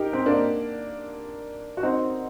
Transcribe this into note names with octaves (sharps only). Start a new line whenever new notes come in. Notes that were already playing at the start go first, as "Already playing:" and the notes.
Already playing: D#4 G4 A#4
C4
A#3 D4
F#4
C4 D#4